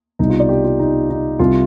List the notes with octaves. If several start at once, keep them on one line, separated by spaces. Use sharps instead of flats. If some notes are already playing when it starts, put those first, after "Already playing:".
C2 B2 G3 D#4
F4
D5
G4
F4
D#4
D#4
C2 C3 G3 F4